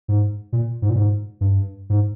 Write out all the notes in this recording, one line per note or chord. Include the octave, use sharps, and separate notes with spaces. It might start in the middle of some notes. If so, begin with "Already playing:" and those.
G#2
A#2
G#2
A#2
G#2
G2
G#2